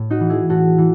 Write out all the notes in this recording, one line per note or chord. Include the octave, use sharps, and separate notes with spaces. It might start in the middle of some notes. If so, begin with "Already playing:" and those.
Already playing: A2
D#4 F#4
E3
E4 G#4
A2 F#4 A4
E3